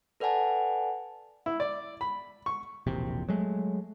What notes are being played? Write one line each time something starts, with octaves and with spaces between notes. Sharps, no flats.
A4 B4 D5 F#5 G#5 A5
E4
D5
B5
C#6
E1 A#1 C3
F#3 G#3 A3